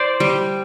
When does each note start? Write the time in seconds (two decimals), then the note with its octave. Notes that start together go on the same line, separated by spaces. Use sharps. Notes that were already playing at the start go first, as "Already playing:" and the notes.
Already playing: C5 D5
0.20 G3